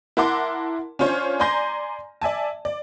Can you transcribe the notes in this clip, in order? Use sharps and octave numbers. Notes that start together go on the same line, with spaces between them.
E4 A#4 F#5 A5 C6 D6
C#4 D4 F4 C5 C#5
D5 G#5 A#5 C6 G6 A#6
D5 E5 G#5 A5
D5